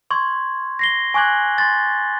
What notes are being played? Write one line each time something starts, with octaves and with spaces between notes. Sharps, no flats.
C6 C#6 G#6
A#6 C7 G7
G#5 C#6 D6 F#6 G#6 F#7
C6 A6